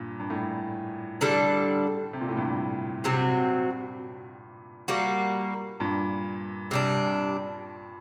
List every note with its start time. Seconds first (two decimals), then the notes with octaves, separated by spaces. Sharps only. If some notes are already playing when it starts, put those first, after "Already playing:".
Already playing: G2 A#2
0.20 G2
0.30 A2
1.21 D3 G3 D4 A4
2.13 C3
2.21 A#2
2.29 A2
2.37 G2 A#2
3.04 C3 F#3 C4 F#4
4.88 G3 A#3 F#4
5.80 G2 A#2
6.71 C3 G3 D4